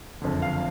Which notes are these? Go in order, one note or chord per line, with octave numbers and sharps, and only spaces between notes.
F#1 F2 D3
F5